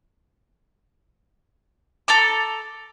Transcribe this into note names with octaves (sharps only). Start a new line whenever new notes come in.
A4 A#5 D6